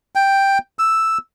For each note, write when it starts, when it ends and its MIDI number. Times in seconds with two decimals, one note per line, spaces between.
0.15 0.58 79
0.79 1.18 88